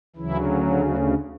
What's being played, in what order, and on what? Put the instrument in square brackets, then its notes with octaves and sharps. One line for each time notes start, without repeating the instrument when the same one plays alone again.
[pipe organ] D2 C#3 E3 F#3 E4
F#3 F#4